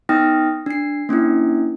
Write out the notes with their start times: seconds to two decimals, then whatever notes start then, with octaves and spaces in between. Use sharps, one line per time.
0.09 B3 D#4 G5 D#6 F6 A#6
0.66 D4 C7
1.09 A#3 C#4 D4 E4